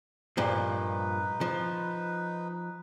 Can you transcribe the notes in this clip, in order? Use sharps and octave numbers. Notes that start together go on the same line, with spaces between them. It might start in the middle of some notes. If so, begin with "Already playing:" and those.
G2 A#2 F3 D#4 B4
F3